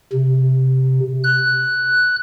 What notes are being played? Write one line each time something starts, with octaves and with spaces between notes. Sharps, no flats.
C3
F#6